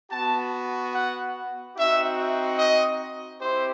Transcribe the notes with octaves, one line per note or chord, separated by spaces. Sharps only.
B3 F#4 A5
F#5
C4 D#4 F#4 E5
D#5
C4 E4 G4 C5